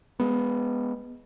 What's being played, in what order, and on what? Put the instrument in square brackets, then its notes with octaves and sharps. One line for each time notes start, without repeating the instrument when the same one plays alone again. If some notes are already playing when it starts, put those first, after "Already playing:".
[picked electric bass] G#3 B3